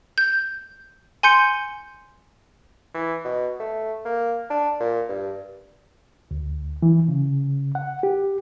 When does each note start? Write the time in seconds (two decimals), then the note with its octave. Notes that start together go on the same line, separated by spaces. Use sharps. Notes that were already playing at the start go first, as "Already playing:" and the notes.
0.18 G6
1.23 G#5 C6 G6 C#7
2.94 E3
3.25 B2
3.60 A3
4.05 A#3
4.50 D4
4.80 A#2
5.09 G2
6.31 D2
6.82 E3
7.08 C#3
7.75 F#5
8.03 G4